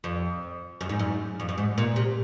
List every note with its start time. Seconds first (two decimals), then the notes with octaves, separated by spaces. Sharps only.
0.04 F2
0.81 F#2
0.89 G#2
0.99 F#2
1.40 F2
1.49 F#2
1.58 G#2
1.78 A#2
1.96 C3